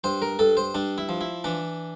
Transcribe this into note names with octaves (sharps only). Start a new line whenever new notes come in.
G2 C5
A#4
G2 A4
C5
G2 D4
E4
F3
E4
E3 D4